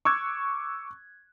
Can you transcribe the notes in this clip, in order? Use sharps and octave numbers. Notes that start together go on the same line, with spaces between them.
C#6 D6 E6 F#6 G#6